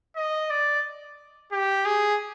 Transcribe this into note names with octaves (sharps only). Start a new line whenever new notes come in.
D#5
D5
G4
G#4